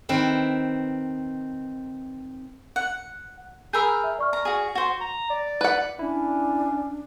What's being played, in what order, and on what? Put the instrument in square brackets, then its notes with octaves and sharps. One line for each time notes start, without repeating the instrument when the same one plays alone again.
[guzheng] D#3 C4 B4
[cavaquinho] F#5
[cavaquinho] G#4 A#4 B5 [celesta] E6 G6
[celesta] E5
D5 C#6 F6
[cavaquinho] A#5
F#4 G#4
[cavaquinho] F#4 C5 [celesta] F#5
[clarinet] A#5
D5
[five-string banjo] B4 F#5
[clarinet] C#4 [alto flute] D4 [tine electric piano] E4